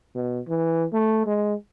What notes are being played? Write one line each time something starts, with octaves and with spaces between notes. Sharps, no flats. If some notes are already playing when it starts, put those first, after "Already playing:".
B2
E3
A3
G#3